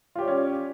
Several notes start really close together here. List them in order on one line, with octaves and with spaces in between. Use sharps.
F4 G4 C#5 D5 C#4